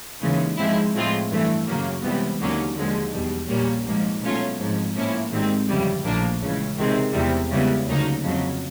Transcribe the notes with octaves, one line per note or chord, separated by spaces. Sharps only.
D#2 C#3 E3 G#3
G#2 F3 G#3 C4 E4
A2 F3 G#3 C4 F4
G2 E3 A3
F#2 C#3 F#3 A#3
C#2 C3 E3 G3 B3
D#2 D3 F#3 A#3 C#4
D#2 D3 F3 G#3
E2 B2 G3
A#1 A#2 G3 A#3 C#4
G#1 G#2 F3 A#3
B2 F#3 A3 C#4 F4
G#1 G#2 F3
A2 F3 A#3 C#4 E4
G#1 G#2 D#3 G3 C4
G1 F2 C#3 E3 G3
A#1 A2 F3 A#3 D4
C#2 C#3 E3
C#2 C3 D#3 G#3 C4
E2 C3 E3 G3
C#2 C#3 E3 G3 B3
D2 C#3 F#3 A#3 D#4
F2 C#3 F#3